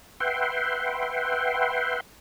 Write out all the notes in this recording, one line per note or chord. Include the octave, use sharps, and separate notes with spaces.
B4 E5 F#5 G5 C6